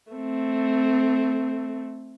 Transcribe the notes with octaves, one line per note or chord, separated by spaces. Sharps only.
A3 C4